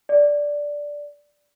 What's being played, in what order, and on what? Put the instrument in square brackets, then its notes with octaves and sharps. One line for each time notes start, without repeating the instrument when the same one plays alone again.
[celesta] D5